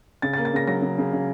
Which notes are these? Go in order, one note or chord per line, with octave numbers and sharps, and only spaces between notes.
C#3 A6
A6
A#3
A6
C#3 A#6
F#3 A#6
C#3
C#3
C#3